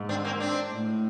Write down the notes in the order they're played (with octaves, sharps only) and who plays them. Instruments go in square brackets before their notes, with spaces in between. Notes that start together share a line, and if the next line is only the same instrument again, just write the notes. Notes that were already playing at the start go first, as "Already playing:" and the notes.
Already playing: [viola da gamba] G#2
[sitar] C4 D4
A#3 C4
C4 D4
[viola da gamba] A2